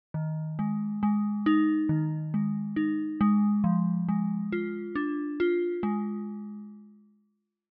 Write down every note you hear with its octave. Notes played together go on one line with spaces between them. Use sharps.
D#3
G#3
G#3
D#4
D#3
G#3
D#4
G#3
F3
G#3
F4
D4
F4
G#3